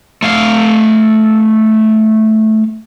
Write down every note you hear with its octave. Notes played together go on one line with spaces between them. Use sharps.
A3 F5